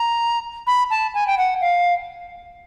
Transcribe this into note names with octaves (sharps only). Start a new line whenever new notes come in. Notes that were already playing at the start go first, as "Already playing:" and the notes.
Already playing: A#5
B5
A5
G#5
G5
F#5
F5